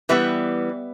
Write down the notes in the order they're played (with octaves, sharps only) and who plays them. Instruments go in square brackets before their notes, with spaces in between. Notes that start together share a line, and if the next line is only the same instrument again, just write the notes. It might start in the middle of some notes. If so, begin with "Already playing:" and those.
[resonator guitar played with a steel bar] E3 G3 B3 B4 E5